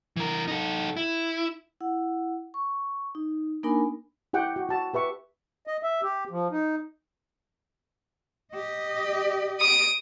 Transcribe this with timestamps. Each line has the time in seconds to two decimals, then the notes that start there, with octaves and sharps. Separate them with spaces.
0.17 E3 A#4
0.48 D#4 A4
0.97 E4
1.81 E4 F#5
2.54 C#6
3.15 D#4
3.63 A#3 D4 D#4 A#4 G#5 B5
4.33 E4 G4 F#5 G5
4.56 F#4
4.69 F#4 A5
4.94 G4 B4 E5 C#6
5.67 D#5
5.83 E5
6.03 G4
6.31 F3
6.52 D#4
8.53 G4 D#5
9.60 D#6 D7